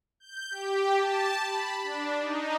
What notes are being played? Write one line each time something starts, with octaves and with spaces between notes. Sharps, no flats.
G6
G4
A5
B5
D4
D#4